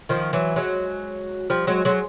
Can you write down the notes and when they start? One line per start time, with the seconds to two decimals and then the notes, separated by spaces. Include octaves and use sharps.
0.09 D#3 F3
0.33 E3 F#3
0.56 F#3 G#3
1.50 F3 G3
1.67 F#3 G#3
1.85 F#3 G#3